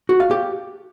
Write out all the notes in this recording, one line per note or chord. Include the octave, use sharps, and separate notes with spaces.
F#4
F5
G4